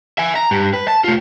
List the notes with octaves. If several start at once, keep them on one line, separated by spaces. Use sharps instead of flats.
E5 G#5
A#5
G2
B4
A5
A3 F4